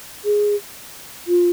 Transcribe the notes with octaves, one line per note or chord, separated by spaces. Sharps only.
G#4
F4